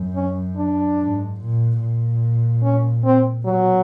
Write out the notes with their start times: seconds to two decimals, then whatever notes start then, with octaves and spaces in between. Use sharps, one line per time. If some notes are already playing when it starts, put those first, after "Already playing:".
Already playing: F#2
0.16 C#4
0.57 D4
0.99 G#2
1.40 A#2
1.81 A#2
2.64 C#4
3.04 C4
3.46 B2 F#3